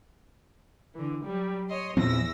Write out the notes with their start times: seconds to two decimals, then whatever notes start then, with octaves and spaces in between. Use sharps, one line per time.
0.95 D3 E3
1.24 F#3 G3
1.68 C#5 D#5 C6
1.97 E2 A#2 F3 C4 E6 A#6